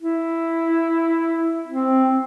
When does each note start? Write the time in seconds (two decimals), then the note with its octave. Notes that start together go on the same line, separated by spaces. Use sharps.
0.02 E4
1.67 C4